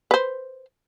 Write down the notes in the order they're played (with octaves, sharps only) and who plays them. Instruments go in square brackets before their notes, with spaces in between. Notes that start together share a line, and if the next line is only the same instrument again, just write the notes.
[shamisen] B4 C5